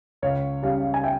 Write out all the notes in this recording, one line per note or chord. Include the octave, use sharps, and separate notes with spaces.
C#2 C#5 F5
C#3 G3 C#4 C#5 F5
G#5
E5 G5